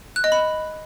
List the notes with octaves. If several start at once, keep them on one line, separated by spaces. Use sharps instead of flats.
F#6
D#5
B5